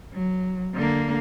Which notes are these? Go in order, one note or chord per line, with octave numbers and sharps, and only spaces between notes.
F#3
D3 A#3